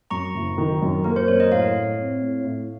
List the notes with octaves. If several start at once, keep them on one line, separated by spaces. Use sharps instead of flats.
F#2 A#5 C#6
F#1
D#3
F#2
A#3 A#4
C5
F#2 C#5
D#5
A2 C#5 F5
A2
C4
A2
A2